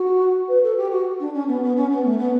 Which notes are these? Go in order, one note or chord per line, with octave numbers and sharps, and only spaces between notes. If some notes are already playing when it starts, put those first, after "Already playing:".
Already playing: F#4
B4
A4
G4
F#4
D4
C#4
B3
B3
C#4
B3
A3
B3